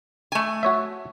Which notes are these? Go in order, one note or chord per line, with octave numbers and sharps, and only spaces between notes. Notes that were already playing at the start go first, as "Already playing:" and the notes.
A3 G#5
F#4 C#5 E5